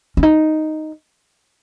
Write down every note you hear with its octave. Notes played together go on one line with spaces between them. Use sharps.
C#4
D#4